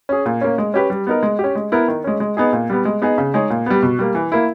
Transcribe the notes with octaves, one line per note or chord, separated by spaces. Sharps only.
C#4 G#4
A#2
A#3 C#4
G#3
C#4 G4 B4
G3
B3 D#4 A#4
G#3
C#4 G4
G#3
B3 E4 A#4
D#3
G#3 C#4
G#3
B3 D#4 G#4
A#2
G3 B3
G#3
B3 D#4 G#4
C#3
G#3 D#4 G#4 C#5
A#2
G3 B3
B2
G3 A#3
E3
A#3 E4